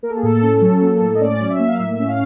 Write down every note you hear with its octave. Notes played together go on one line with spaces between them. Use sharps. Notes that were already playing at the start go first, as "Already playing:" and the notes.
A#3 A#4
A4
G#4
A2 A4
C#4
F#3
A#3
A2
D#5
C#4 D5
F#3
E5
A#3
F5
A2 E5
E5
C#4
F5